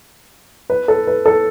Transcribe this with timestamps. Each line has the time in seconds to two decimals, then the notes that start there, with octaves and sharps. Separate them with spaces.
0.70 B4
0.88 A4
1.07 B4
1.26 A4